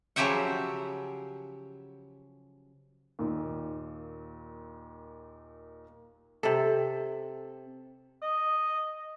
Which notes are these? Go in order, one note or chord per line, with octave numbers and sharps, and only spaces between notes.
C#3 F3 F#3 G4 E5 F#5
D#2 A#2
C3 A4
D#5